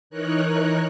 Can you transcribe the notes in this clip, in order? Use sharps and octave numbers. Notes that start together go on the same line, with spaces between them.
E3 D#4 A#4 C#5 F#6